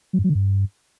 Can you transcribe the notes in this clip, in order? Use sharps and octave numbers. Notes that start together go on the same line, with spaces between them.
F#3
G2
F#3
D3
G2